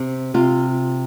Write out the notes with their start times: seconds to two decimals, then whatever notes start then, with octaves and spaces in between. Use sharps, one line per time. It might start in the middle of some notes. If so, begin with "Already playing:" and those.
Already playing: C3
0.34 C3 F4